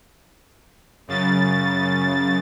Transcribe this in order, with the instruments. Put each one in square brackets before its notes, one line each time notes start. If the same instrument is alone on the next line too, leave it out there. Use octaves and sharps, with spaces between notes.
[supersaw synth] F#2 C#3 A6